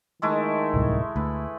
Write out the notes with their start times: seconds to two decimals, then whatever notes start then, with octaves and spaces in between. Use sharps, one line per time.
0.22 D#3 G#3 A3 E4
0.74 D1 C2 A2
1.16 D2 B4